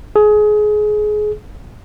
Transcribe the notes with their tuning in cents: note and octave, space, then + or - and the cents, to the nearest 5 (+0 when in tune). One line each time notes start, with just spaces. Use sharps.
G#4 +25